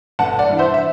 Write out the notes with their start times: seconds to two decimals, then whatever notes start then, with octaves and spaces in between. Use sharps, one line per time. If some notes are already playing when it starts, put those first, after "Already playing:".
0.19 G1 F#5 A5
0.39 D5 F#5
0.49 G2 E3
0.59 C5 E5
0.74 E5